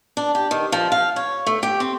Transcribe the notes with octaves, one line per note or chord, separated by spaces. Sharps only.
D4
G4
D#3
F3
F5
C#5
A3
G4
C4